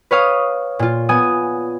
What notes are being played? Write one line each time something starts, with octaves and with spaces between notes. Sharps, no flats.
B4 C#5 F5 D#6
A#2 F4
B3 G#5 D#6